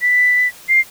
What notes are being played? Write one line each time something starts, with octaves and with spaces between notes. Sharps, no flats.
B6
C7